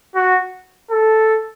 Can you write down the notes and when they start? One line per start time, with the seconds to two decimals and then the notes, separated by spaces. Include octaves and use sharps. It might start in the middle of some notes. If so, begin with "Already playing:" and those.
0.15 F#4
0.91 A4